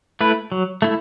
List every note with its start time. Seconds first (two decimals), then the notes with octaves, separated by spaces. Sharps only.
0.21 A3 E4 B4
0.52 F#3
0.82 A3 E4